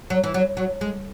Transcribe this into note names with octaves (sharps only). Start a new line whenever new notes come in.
F#3
E3
F#3
F#3
G#3